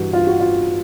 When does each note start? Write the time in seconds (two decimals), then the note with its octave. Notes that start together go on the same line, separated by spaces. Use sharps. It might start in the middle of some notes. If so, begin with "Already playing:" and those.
Already playing: G2 E3 F#4
0.13 F4
0.27 F#4
0.40 F4